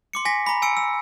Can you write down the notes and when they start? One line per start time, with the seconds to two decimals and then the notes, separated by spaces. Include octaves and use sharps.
0.13 C6 D6 C#7
0.25 G#5 A#6 B6
0.46 A#5 B5
0.62 G#5 E6 C#7 D7
0.77 E6